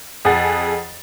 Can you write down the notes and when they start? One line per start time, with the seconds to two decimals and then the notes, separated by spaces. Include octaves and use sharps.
0.25 F2 G#4 F#5 A6